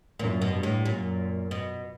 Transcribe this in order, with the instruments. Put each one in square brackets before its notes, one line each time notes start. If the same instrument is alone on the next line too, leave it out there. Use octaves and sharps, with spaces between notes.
[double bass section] F#2 [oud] A#2
[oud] B2
[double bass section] G2
[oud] A2
[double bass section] F#2 [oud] A#2
[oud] B2